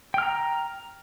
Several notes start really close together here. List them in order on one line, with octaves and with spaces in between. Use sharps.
G5 F6 A#5